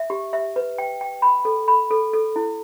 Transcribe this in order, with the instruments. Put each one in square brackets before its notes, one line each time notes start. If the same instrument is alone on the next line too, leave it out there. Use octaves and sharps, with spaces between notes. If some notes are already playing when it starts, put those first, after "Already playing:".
Already playing: [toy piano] E5
G4
E5
B4
G5
G5
B5
A4
B5
A4
A4
E4